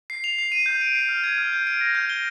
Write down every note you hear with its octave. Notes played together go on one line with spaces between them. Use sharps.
C7
F7
C7
D#7
G6
D7
C7
F6
G#6
F6
G6
D7
A#6
G6
G7